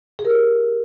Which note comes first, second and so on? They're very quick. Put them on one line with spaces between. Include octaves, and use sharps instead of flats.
G#4 G4 A#4